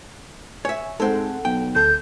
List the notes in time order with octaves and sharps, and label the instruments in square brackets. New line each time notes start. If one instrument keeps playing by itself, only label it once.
[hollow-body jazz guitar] C#5 E5 [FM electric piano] G#5
[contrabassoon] G#2 [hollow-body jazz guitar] G#3 C4 [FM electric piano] A4 F#5
[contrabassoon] B1 [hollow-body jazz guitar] G5
[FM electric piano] D2 A4 [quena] G6